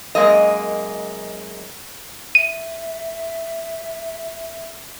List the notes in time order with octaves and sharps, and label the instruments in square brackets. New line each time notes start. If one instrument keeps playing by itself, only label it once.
[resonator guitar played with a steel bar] F#2 G#3 A#3 D#5
[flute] E5 [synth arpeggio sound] D#7